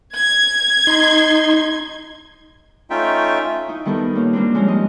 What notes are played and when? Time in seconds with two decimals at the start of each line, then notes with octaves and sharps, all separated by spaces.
0.15 G#6
0.87 D#4 C6
2.90 A3 C#4 D#4 F4 E5 G5
3.68 D#4 E4
3.85 D#3 G3 B3 A4 A#4
4.15 A#3 C#4 F4
4.33 G3 A#3 C4 D4
4.54 F3 G#3 C4 C#4 D#4
4.68 D#5